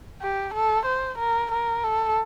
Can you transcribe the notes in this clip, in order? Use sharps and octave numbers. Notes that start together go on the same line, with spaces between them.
G4
A4
C5
A#4
A#4
A4